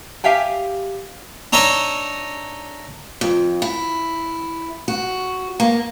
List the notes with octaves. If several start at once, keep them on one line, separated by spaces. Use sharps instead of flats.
G4 E5 F5 G5 G#5
D4 D#4 C#5 D#5 E5
F2
E4
F#4
A#3